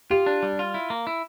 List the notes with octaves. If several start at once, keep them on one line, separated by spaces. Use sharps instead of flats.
F4 G4
D4
G3
F4
E4
A#3
E4